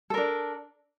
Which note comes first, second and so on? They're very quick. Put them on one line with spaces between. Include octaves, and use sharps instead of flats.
A4 A#4 D4